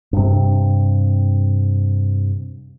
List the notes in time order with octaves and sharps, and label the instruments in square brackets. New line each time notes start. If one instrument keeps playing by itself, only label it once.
[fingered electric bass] G2 C3